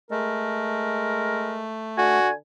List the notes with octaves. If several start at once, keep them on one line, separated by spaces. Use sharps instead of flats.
G#3 A3 A#4
D3 F#4 G#5